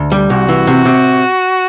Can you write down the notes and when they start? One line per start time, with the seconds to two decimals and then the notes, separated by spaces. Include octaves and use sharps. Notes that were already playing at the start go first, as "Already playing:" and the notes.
Already playing: D2
0.12 G3
0.30 C2 F#4
0.49 E3
0.67 C3
0.85 C3